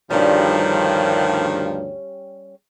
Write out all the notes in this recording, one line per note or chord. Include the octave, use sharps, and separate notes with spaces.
D2 G2 D#3 F3 G3 C#4